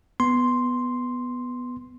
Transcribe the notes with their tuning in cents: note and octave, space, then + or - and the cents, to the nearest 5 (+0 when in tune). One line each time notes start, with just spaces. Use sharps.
B3 +0 C6 +0